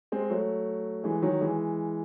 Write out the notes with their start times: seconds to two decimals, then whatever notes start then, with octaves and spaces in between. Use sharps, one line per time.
0.12 G#3 C4
0.30 F#3 A3
1.04 E3 G#3
1.22 D#3 F#3
1.41 E3 G#3